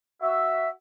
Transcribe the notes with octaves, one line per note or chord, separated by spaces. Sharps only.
F#4 E5